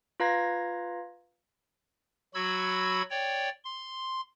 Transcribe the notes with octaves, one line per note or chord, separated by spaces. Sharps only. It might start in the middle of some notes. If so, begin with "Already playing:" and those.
F4 B4 F5 A#5 G#6 A#6
F#3 F#4 B5 E6 G#6
C#5 D5 G5
C6